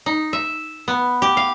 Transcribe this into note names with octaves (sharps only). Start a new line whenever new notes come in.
D#4
E5
B3
G4
F5